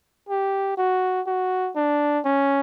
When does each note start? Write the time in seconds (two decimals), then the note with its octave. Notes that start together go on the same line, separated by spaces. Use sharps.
0.29 G4
0.78 F#4
1.27 F#4
1.76 D4
2.25 C#4